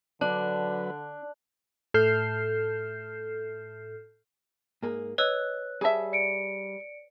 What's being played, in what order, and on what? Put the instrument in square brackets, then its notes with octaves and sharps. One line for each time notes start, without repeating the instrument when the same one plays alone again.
[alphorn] D3 [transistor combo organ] F#3 B4 [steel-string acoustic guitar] D4 [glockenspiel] A5 F#6 F#7
[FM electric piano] A2 A4 F6 G6 C7
[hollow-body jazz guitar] G#2 A#3 G#4
[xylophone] B4 C#5 E6 [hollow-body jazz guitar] D#5 [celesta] F#6
[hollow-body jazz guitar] G3 A5 [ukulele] G#4 E5
[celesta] D5 C#7 D7